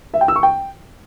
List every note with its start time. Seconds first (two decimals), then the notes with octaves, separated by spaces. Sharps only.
0.14 E5
0.21 G5
0.28 E6
0.36 C#6
0.43 G5